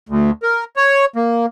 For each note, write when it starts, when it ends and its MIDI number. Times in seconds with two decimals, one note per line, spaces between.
0.09 0.31 38
0.43 0.64 70
0.76 1.05 73
1.16 1.46 58